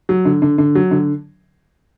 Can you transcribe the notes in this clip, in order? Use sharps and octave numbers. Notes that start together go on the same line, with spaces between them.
F#3
D3
D3
D3
F#3
D3